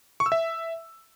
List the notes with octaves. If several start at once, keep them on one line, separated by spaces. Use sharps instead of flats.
C#6
E6
E5